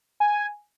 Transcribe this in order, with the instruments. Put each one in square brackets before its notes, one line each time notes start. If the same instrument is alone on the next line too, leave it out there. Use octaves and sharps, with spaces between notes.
[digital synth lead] G#5